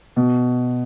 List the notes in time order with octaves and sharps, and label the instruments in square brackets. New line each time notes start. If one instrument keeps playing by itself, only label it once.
[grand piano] B2